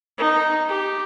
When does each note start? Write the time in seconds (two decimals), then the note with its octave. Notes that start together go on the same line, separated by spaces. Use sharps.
0.18 D#4
0.69 G4